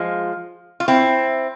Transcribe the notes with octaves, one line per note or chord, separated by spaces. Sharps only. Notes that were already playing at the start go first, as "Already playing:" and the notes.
Already playing: F3 G#3
F4
C4 E4